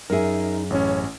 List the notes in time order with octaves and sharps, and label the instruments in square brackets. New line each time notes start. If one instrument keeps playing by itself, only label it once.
[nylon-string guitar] F#2 G#4 [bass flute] D#4 [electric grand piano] A#4 E5
[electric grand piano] A1 C#4 [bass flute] C#5